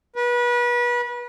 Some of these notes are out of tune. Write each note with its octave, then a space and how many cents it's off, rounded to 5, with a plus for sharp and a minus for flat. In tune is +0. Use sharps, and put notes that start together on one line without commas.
B4 -30